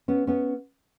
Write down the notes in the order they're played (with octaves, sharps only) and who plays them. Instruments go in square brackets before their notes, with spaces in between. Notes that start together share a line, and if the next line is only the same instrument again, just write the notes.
[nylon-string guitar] B3 C#4
B3 C#4